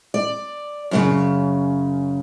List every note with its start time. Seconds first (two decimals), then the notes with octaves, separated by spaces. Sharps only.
0.14 D5
0.91 F#2 A2 C#3